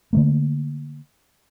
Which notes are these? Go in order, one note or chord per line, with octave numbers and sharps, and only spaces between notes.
D3 A3 A#3